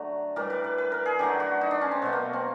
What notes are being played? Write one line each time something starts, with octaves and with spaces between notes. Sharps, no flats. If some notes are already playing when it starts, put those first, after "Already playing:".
Already playing: D3 F#3 A3
A2 E3 G3 A#4
B4
B4
B4
A#4
G#4
D3 F#3 A3 G4
F#4
D#4
D4
C#4
C4
B2 F#3 A3 B3
A#3
C4